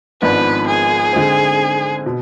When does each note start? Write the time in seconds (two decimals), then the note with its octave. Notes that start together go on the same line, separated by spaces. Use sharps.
0.22 G#1 G#2 F3 B3 D4 B4
0.68 G#4
1.13 D3 G#3 C4
2.06 B2